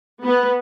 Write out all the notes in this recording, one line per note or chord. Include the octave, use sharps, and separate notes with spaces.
B3